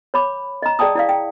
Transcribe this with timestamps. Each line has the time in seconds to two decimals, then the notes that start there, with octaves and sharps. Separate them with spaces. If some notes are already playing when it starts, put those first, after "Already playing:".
0.14 C#5 B5 D6
0.62 D#5 A#5
0.79 G#4 D5 G5 A5 D#6
0.95 E4 D5 F5
1.09 G5